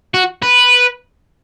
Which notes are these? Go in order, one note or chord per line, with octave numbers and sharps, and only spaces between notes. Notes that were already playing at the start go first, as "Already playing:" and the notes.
F#4
B4